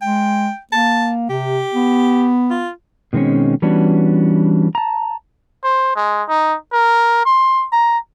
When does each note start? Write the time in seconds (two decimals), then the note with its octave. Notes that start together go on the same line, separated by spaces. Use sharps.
0.02 G#3 G5
0.72 A#3 A5
1.30 C3 G4
1.74 B3
2.50 F4
3.13 B2 D#3 G#3 C4 C#4
3.62 E3 G3 B3 C#4 D4 F#4
4.75 A5 A#5
5.64 C5
5.96 G#3
6.29 D#4
6.72 A#4
7.26 C6
7.72 A#5